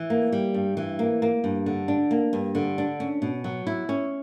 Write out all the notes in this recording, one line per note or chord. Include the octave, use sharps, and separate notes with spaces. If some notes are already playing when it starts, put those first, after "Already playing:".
Already playing: E3
A#3
G3
G2
E3
A#3
A#3
G2
D3
D4
A#3
G2
D3
D4
C#4
B2
F#3
E4
C#4